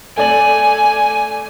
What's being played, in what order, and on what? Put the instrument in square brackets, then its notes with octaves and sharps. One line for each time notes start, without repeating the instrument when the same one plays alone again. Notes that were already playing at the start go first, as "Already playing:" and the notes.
[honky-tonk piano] A3 D5 F#7 [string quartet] G#5